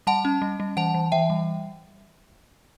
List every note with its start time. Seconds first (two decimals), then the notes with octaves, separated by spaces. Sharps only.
0.07 G3 F#5 A5
0.25 C#4
0.42 G3
0.60 G3
0.77 E3 F#5 A5
0.95 E3
1.12 E3 E5 G5
1.30 G3